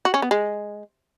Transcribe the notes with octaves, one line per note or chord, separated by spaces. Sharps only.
F#4
C#4
B3
G#3